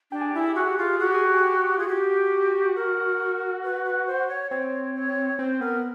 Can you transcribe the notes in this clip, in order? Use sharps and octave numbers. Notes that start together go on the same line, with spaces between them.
D4 G4
G#4
E4 G4
G#4
G4
F#4 G#4
G4
F4 G#4
G4
F#4 G#4
G4
G#4
G4
G#4
G4
F4 G#4
F#4 G4
A#4
B4
B4
C5
C#5
C4 C#5
C#5
C4 C5
B3 A#4